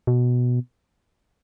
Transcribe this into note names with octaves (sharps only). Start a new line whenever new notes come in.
B2